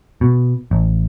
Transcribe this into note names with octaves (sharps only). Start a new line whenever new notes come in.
B2
A1